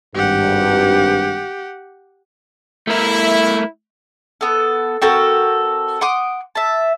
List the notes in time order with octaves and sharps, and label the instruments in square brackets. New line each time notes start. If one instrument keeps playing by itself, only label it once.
[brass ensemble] G#1 G2 [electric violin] G4 F#5
[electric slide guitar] A3 A#4 [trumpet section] E4
[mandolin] B3 A4
C4 F#4 A4 A#4
F#5 C6 D6 D#6
E5 A5